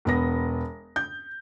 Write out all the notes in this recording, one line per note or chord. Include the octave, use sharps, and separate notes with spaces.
E1 B3 A#6
G6